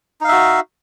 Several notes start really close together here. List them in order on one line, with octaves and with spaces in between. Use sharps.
D#4 F5 E5 F#4